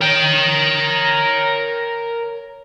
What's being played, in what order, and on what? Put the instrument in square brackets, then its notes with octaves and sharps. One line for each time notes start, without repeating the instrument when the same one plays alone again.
[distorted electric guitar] A#4 G5 [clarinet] C#5